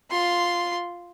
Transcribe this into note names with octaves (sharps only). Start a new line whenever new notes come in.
F4 C6